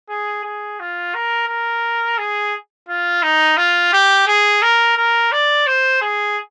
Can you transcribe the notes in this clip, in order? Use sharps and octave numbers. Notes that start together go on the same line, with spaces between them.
G#4
G#4
F4
A#4
A#4
G#4
F4
D#4
F4
G4
G#4
A#4
A#4
D5
C5
G#4